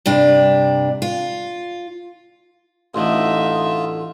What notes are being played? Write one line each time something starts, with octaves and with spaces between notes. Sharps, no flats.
G2 C3 D4
F4
A1 D2 D3 D#4 F4 E5